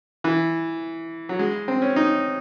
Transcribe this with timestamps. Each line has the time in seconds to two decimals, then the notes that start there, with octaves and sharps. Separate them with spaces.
0.24 E3
1.29 F#3
1.39 G#3
1.68 C4
1.82 C#4
1.96 D#4